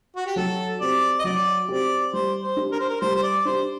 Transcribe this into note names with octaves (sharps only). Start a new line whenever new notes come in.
F#4
G4
F#3 A4
C4 G4 D5
D#5
F#3 D5
C4 G4 D5
G3 C5
C5
D4 G4
A#4
C5
A#4
G3 C5
C5
D5
D4 G4 C5